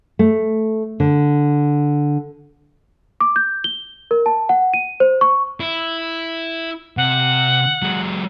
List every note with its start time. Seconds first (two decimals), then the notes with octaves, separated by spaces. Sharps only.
0.19 A3
1.00 D3
3.21 D6
3.36 G6
3.64 G7
4.11 A#4
4.26 A5
4.49 F#5
4.74 D#7
5.00 C5
5.21 C#6
5.60 E4
6.97 C3 F#5
7.83 F#3 G#3